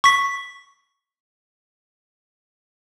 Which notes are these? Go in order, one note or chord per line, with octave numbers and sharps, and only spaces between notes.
C#6 B6